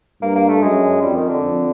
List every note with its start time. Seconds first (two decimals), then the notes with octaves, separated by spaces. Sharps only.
0.22 G2 A#3
0.35 A#3
0.49 A3
0.62 F#2 G#3
1.02 F2 G3
1.15 D#3
1.29 D3
1.42 F2